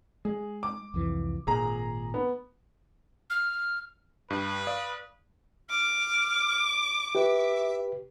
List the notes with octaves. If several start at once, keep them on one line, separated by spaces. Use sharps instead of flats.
G#3 G#4
D6
C2 F2 E3
G#1 A#2 G#4 A#5
B3
F6
G2 B4
D5 F5 D#6
D6 F6
G4 B4 E5